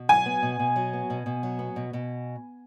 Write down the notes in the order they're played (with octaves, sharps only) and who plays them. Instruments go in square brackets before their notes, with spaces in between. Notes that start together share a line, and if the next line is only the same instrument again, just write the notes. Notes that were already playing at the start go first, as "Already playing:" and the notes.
Already playing: [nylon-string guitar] B2
[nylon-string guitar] F#3 [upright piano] G#5
[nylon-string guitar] B3
B2
B2
F#3
B3
B2
B2
F#3
B3
B2
B2